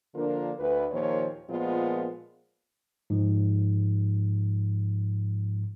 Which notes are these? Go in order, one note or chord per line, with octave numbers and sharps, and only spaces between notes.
D3 F3 A#3 D4 F4 A#4
D2 B4
D#2 A#2 F3 A#3 C5 C#5
A#2 F3 G#3 A#3 B3 F4
G#2 F3